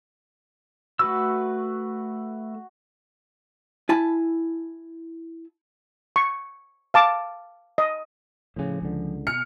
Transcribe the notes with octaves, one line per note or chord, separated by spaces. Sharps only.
A3 F#4 B4 E6
E4 G#5 A5 B5
C#6
F5 A5 D6
D#5
A2 C#3 F3 G#5
C#2 D3
B2 F6 C#7